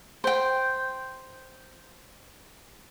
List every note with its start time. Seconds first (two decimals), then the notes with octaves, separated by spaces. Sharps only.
0.24 C5 G5